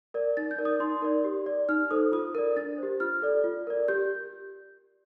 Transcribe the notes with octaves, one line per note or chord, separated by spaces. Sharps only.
A#4 D5
D#4 A6
G6
A#4 D5
D#6
D#4 C6
A#4 D5
G4
D5
D#4 F6
A4 C5 D#6
F4 D#6
A#4 D5
D4 A6
G4 C5
F4 F6
A4 D5
F4
A#4 D5
G4 G6